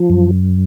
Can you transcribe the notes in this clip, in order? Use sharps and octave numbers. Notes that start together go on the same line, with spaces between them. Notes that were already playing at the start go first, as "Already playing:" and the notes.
Already playing: F3
F#2